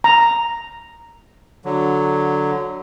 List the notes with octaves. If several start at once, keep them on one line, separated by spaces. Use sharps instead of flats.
A#5
D3 F#3